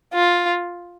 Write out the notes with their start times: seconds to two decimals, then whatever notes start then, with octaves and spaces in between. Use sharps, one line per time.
0.14 F4